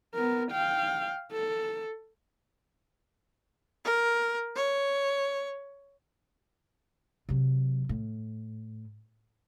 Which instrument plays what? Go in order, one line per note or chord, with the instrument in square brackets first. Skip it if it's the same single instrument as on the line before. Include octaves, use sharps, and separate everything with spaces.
[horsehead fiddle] B3 A#4
F5 G5
A4
[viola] A#4
C#5
[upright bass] C3 F#3
A2